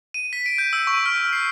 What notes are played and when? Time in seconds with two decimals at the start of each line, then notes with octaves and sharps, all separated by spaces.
0.14 D#7
0.33 B6
0.46 D7
0.58 G6
0.73 E6
0.87 C#6
1.06 F6
1.33 C7